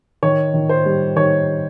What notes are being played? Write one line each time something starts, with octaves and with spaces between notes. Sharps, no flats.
D#3 C#5
D#3
C5
G3
D#3 C#5